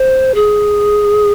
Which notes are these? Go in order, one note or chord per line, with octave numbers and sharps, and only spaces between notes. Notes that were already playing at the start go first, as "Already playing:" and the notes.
Already playing: C5
G#4